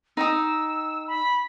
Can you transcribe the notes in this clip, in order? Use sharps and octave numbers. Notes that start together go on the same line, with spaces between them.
D#4 G5 D#6 E6
B5